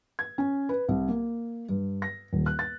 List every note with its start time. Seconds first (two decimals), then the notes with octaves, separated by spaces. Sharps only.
0.19 G#6
0.38 C#4
0.69 B4
0.88 C2
1.08 A#3
1.69 G2
2.02 A#6
2.33 D#1
2.46 F#6
2.59 A6